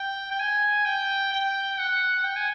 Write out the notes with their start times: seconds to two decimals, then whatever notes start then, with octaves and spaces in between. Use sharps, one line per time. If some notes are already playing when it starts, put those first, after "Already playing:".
Already playing: G5
0.31 G5
0.40 G#5
0.86 G5
1.32 G5
1.79 F#5
2.24 G5
2.36 G#5